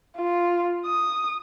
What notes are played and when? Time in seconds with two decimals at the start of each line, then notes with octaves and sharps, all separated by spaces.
0.18 F4
0.86 D#6